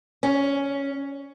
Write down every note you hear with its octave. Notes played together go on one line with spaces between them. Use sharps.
C#4